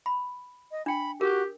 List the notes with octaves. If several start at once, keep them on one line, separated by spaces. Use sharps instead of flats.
B5
D#5
D4 G5 B5
F#4 G4 A#4